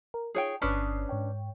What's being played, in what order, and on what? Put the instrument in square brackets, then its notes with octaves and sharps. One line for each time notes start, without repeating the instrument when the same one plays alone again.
[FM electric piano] A#4
[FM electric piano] D#4 F4 [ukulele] G#4 C#5 G5
[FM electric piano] G1 D#6 C7 [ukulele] C#4 D4 B4
[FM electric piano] G#2 C#5 G5